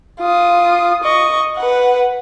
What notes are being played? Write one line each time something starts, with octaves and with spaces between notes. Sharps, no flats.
F4 D#6
D#5 C#6
B4 F#5